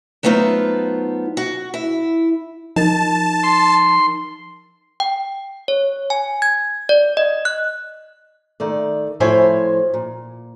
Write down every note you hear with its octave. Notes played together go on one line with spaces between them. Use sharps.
F#3 A3 B3 D#4 F4 C5
F#4
E4
F3 D#4 A#4 A5
C6
G5
C#5
G#5
G#6
D5
D#5
F#6
D#3 A3 D5
A2 F3 E4 C5 C#5 G#5
A#2